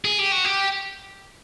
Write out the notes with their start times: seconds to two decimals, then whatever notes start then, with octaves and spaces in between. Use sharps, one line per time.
0.05 G#4
0.19 G4
0.32 F#4
0.45 G4